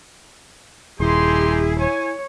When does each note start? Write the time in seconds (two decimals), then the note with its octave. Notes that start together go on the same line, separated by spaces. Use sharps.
1.00 D#1 D#4 E4 G4 G#4 C6
1.79 C#5 G#5